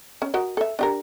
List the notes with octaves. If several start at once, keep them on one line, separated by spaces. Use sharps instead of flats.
C#4
F#4 A#4 D#5
A4 E5
D4 G4 A#4